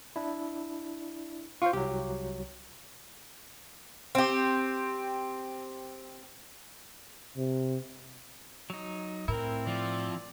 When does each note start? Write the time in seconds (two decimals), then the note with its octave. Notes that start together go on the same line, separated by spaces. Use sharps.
0.16 D4 E4
1.62 F4 C5 F5 C#6
1.73 C2 F#3 G4
4.15 C4 G4
7.37 C3
8.70 F#3 D#4
9.28 A2 C4 E4 A#4
9.67 F3 D5